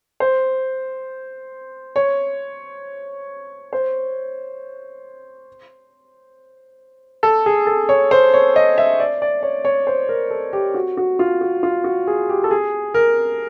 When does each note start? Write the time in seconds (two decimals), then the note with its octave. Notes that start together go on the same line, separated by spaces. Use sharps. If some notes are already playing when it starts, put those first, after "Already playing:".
0.20 C5
1.96 C#5
3.73 C5
7.23 A4
7.46 G#4
7.67 A4
7.89 C#5
8.11 C5
8.34 C#5
8.56 D#5
8.78 E5
9.00 D5
9.22 D5
9.43 C#5
9.65 C#5
9.87 C5
10.09 A#4
10.30 A4
10.53 G4
10.74 F#4
10.97 F#4
11.19 F4
11.41 F#4
11.63 F4
11.84 F#4
12.07 G#4
12.29 G4
12.44 A4
12.51 G#4
12.94 A#4